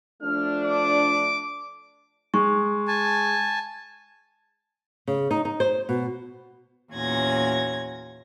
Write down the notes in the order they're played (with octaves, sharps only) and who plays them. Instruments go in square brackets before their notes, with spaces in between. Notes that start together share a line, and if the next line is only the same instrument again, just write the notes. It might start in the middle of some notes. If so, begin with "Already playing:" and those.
[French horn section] F3 A3 D4 [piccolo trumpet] F6
[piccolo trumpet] D6
[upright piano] G#3 [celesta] C#6
[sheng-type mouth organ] G#5 A5
[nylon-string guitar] C#3
D#4
D#4
C5
B2
[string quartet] E2 A#2 C#4 F#4 G#6 A#6